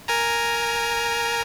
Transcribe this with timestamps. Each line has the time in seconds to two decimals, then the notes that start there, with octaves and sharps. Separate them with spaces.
0.08 A#4 G#5 A#5